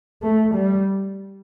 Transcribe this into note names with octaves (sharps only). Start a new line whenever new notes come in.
A3
G3